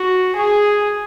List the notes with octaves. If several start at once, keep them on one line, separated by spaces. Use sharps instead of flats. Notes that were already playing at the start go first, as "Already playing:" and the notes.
Already playing: F#4
G#4